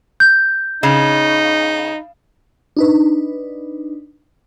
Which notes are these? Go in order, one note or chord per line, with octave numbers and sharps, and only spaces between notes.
G6
C#3 D#4
D4 D#4 B4